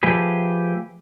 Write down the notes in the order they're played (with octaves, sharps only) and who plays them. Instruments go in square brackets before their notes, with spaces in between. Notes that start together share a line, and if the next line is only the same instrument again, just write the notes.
[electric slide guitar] F3 A3 G4 G#4 B4